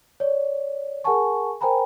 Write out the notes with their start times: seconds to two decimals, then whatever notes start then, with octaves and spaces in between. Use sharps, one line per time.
0.20 C#5 D5
1.04 G#4 A#4 F#5 G#5 A5 C#6
1.61 A#4 C5 G5 G#5 A#5 B5